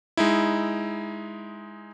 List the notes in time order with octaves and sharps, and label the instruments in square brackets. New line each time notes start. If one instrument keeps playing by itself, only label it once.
[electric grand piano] G#3 D#4 E4